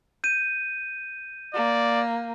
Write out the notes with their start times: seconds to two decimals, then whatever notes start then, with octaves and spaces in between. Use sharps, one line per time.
0.24 G6 D#7
1.54 A#3 D5